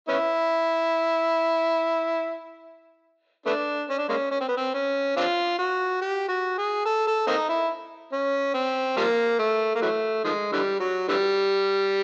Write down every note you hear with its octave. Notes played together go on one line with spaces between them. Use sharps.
B3 C#4 E4
A3 B3 D4
C#4
D4
G#3 A#3 C#4
C#4
C4
B3
C4
C#4
C4 D4 F4
F#4
G4
F#4
G#4
A4
A4
A#3 C4 D#4
E4
C#4
C4
F3 G3 A#3
A3
A#3
E3 F#3 A3
D#3 F3 G#3
D3 E3 G3
F#3
D3 E3 G3